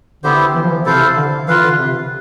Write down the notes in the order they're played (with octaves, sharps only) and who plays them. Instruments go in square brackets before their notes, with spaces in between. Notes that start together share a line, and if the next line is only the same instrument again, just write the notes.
[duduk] D3 [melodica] B3 E4 G4 C5
[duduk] E3
F3
E3
[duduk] C3 [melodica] E4 A4 C5 F5
[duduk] D3
[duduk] E3 [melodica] F4 B4 F5
[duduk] D3
C3